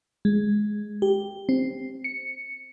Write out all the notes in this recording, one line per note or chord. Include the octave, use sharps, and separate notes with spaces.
G#3
G4
C4
C#7